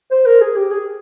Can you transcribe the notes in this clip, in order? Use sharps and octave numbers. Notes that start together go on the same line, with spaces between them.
C5
A#4
G#4
G4
G#4